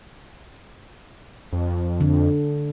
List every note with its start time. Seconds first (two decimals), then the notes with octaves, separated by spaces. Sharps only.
1.53 F2
2.01 D3